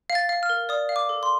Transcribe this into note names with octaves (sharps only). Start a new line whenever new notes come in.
F5
A6
F5
F6
A#4
D5 D#6
F5
D6
A4
C6